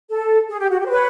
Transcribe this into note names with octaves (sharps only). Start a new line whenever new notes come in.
A4
G#4
G4
F#4
G4
C5
B4 C#5